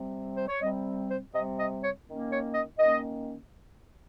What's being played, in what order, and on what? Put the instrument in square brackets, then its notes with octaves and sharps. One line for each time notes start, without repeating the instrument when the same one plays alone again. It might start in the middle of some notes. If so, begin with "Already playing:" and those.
Already playing: [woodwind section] C3 G3 C4
C5
C#5
C3 G3 C4 D#5
C5
C3 G3 C4 D#5
D#5
C#5
D#3 A#3 C#4
C#5
D#5
D#3 A#3 C#4 D#5